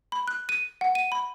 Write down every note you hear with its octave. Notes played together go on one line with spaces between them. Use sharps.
B5
F#6
D#7
F#5
D#7
B5